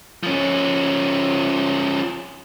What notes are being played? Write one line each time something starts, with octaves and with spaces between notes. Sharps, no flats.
F3 C#4